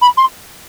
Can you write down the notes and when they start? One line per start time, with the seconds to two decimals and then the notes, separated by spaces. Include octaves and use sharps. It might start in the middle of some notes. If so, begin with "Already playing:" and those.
0.02 B5
0.17 C6